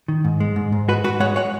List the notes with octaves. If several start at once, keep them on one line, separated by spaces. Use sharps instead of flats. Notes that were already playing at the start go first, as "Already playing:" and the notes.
D#3
G#2
G#3
G#2
G#2
G#3 F#4 B4
G#2 F#4 B4
G#3 C#5 F#5
G#3 C#5 F#5